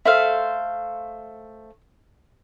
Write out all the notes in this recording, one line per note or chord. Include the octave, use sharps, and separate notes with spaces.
A3 A4 C5 E5 F5